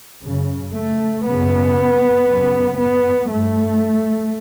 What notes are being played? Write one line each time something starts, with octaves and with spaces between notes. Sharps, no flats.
F#2 C#3
A3
F#2 C#3 B3
F#2 C#3
B3
G2 A3